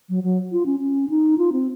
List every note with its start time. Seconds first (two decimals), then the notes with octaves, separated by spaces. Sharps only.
0.09 F#3
0.23 F#3
0.52 F4
0.66 C#4
0.80 C#4
1.10 D#4
1.38 F4
1.52 C4